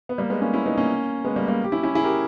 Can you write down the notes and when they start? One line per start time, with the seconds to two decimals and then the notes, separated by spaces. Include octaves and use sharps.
0.09 B3
0.18 G3 A#3
0.30 G#3 B3
0.42 A#3 C#4
0.53 C#4 E4
0.66 B3 D#4
0.77 A#3 C#4
1.25 G#3 B3
1.36 G3 A#3
1.48 G3 A#3
1.64 G4
1.72 C#4 E4
1.83 C#4 E4
1.95 E4 G#4
2.04 G4 A#4